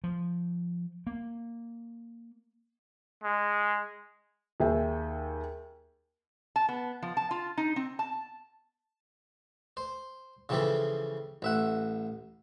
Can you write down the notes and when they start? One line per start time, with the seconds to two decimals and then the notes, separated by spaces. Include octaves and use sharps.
0.04 F3
1.07 A#3
3.23 G#3
4.60 D#2 G#4 E5 G5
6.56 A5
6.69 B3
7.02 F3
7.17 A5
7.31 F4
7.58 D#4
7.76 C4
7.99 A5
9.77 C5
10.49 C#3 E3 F3 G4 A4
11.42 A1 E5 F#5